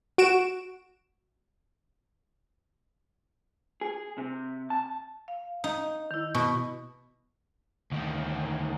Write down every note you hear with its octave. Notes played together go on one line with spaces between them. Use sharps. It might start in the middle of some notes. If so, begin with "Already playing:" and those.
F#4 D7 E7
G#4
C3
A5
F5
D#4
D#3 E4
B2 C#6 F#6
D2 D#3